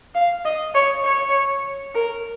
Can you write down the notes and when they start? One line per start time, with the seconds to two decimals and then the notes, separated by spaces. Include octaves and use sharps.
0.15 F5
0.45 D#5
0.74 C#5
1.05 C#5
1.95 A#4